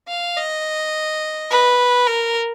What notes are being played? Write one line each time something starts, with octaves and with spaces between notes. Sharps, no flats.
F5
D#5
B4
A#4